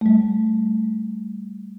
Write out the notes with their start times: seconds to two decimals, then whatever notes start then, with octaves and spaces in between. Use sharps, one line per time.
0.01 G3 A3